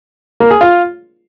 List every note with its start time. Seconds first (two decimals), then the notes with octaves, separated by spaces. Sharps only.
0.40 A#3
0.51 G#4
0.61 F4